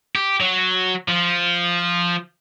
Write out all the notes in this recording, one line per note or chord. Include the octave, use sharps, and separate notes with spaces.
G4
F#3
F3